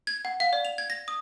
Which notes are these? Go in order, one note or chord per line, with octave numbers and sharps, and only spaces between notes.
G#6
F#5
F5
D5
F7
G#6
A#6
D#6